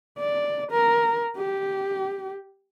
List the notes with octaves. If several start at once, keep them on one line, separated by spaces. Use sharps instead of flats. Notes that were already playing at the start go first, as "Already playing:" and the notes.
D5
A#4
G4